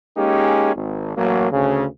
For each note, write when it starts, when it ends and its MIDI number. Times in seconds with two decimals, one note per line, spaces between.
0.17 0.74 56
0.17 0.74 58
0.17 0.74 61
0.17 0.74 63
0.17 0.74 67
0.17 0.74 68
0.75 1.16 32
1.17 1.48 33
1.17 1.48 54
1.17 1.48 58
1.52 1.86 38
1.52 1.86 49